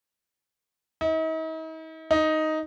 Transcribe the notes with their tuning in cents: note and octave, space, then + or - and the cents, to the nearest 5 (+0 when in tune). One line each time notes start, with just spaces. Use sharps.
D#4 +45
D#4 +5